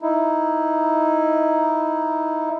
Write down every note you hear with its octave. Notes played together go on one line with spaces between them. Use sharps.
D#4 E4